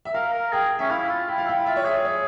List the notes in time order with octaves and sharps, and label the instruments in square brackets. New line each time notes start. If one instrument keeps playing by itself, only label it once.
[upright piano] E5
[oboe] A#4 [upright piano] F5
[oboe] A#4
[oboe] G#4 [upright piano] G5
[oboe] C#4 [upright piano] E5
[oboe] E4 [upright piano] F5
[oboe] F4
[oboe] E4 [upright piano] G5
[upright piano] F5
[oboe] E4 [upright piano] G5
[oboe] F4 [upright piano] E5
[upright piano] C#5
[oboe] G#4 [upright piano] E5
[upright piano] C#5